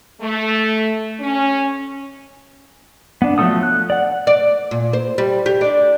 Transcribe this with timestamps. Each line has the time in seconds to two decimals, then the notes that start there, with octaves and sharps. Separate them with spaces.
0.21 A3
1.20 C#4
3.22 B3 D4
3.38 F3 F#3 A3 A4 D#6
3.63 F#6
3.90 D5 F#5
4.27 D5
4.71 A#2
4.93 C5
5.18 G3
5.46 G4
5.61 D4